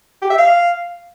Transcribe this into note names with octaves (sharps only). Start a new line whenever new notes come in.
G4
E5
F5